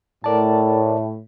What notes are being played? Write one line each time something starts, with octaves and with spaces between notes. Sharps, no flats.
A2 A#4 D5 A5